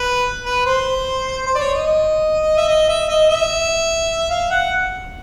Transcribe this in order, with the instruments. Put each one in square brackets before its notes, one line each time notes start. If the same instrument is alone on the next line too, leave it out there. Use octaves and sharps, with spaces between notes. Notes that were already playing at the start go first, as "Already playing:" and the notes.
Already playing: [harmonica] B4
B4
C5
C5
D5
C#5
D#5
E5
D#5
E5
D#5
E5
F5
F#5